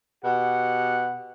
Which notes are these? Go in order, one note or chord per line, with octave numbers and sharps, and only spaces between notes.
B2 G4 F#5